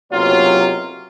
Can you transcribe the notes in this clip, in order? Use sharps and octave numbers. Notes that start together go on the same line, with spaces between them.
F#1 B1 C3 F#3 A#3 F4